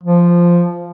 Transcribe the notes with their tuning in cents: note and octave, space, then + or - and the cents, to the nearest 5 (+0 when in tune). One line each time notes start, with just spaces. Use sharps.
F3 -5